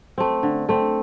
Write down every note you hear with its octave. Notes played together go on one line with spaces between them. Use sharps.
A3 C4
D3
A3 C4